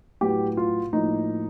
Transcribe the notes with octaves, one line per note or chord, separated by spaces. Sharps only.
A2 F#3 B3 G4
F4
A2 F3 A#3 D#4